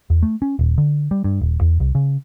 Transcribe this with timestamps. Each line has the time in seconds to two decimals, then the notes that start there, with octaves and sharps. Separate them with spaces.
0.10 E2
0.23 A3
0.42 C#4
0.59 D#1
0.78 D3
1.11 G3
1.24 G2
1.41 D#1
1.61 E2
1.80 C2
1.95 C#3